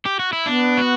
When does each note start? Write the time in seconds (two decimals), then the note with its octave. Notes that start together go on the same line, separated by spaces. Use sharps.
0.06 G4
0.19 F#4
0.33 E4
0.46 B3 D4
0.77 F#4